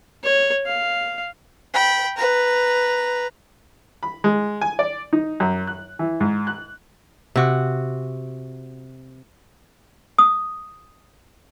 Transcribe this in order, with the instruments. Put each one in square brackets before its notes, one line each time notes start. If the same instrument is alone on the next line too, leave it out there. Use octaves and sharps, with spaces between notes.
[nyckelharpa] C#5
F5
[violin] G5 B5
B4 A#5
[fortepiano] B5
G#3
G#5
D5
D#4
F#2
F#6
E3
G#2
F#6
[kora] C3 F#4
[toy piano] D#6